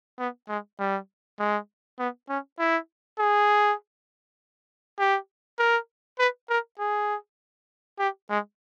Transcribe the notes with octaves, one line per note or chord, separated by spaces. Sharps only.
B3
G#3
G3
G#3
B3
C#4
E4
G#4
G4
A#4
B4
A#4
G#4
G4
G#3